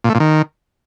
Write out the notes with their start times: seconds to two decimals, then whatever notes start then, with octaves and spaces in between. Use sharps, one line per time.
0.04 A#2
0.10 A3
0.15 A#2
0.20 D#3